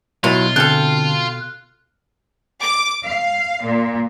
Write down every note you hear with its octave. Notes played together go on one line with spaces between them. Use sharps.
B2 F#3 E4 F4
D3 C4 A4 G5 A5 F6 F#6
D6
F5
A#2